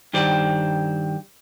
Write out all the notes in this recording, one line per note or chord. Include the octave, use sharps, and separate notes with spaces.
G2 D#3 G4 C5 D5